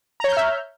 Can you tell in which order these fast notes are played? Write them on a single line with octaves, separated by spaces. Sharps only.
A#5 C#5 G6 F6 E5